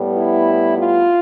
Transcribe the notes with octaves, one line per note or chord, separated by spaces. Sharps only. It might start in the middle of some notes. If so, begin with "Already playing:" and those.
Already playing: A2 G3 B3
E4
F4